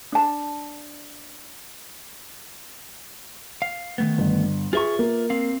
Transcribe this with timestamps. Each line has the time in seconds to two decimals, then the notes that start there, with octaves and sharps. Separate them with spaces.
0.12 D4 A5
3.62 F5
3.98 D#3 A3 B3
4.18 G1
4.73 F4 G#4 B4 E5 C#6
4.99 A#3
5.30 C4 F5